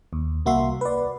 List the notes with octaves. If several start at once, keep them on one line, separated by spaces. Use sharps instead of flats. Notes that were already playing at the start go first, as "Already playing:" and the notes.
D#2
C2 A#3 F#4 E5 C6
B4 D5